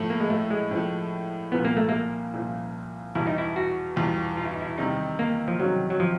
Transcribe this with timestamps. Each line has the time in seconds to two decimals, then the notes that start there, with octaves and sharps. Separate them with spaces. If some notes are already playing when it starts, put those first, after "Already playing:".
Already playing: A2 F3 A3
0.10 A#3
0.20 G#3
0.30 A3
0.50 G#3
0.71 A2 F3 A3
1.52 C2 A#2 F3 B3
1.65 A#3
1.77 A3
1.89 A#3
2.34 C2 A#2 F3
3.15 E2 B2 G3 E4
3.27 D#4
3.38 E4
3.56 F#4
3.96 E2 B2 G3 F4
4.37 F4
4.45 E4
4.53 D#4
4.61 E4
4.78 C3 D#3 G3 D#4
5.19 A#3
5.48 F3
5.60 C3 D#3 F#3 G3
5.90 F#3
6.00 F3